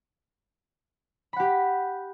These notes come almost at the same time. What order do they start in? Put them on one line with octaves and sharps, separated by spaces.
B5 F#5 G4